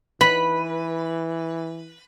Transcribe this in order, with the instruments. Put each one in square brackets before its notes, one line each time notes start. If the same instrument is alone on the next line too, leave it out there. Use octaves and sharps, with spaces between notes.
[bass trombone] E3 [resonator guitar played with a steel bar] B4 [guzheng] B5